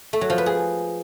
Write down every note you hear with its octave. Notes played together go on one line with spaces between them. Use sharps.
A3
F#3
F3
B4
G#4